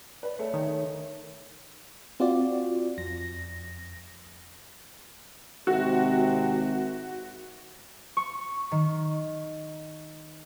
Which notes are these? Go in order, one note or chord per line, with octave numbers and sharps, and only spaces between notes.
B4 D5
A3 G#4 C#5
D#3
C4 F4 F#4 D5
F2 A#6
G#1 C3 F#4
C#6
D#3